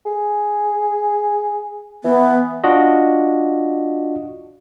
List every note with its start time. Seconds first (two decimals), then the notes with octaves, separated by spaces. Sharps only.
0.06 G#4
2.04 E3 B3
2.64 D4 F4 F#4 D#5